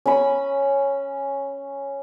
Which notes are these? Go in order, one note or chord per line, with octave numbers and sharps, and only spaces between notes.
C#4 B5